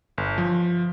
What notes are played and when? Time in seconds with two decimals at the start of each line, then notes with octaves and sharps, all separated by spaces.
0.18 G1
0.38 F3